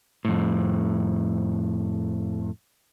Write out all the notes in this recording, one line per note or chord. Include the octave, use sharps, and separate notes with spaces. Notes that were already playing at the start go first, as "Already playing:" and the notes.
F2 A2